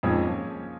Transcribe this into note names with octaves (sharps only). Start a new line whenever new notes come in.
F2 G#2 F3 A#3 C#4 G#4 C#5